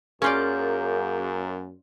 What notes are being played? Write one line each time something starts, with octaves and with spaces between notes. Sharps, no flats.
F#2 A#3 C#4 F4 G#4 D5 G6